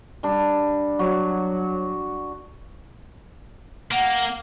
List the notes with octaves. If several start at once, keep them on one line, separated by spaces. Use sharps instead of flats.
G3 D4
F#3 F#4
A#3 F#5